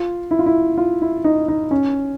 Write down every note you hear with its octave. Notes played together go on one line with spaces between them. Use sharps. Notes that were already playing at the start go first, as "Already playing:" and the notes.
Already playing: F4
E4
F4
E4
F4
E4
D#4
D#4
C#4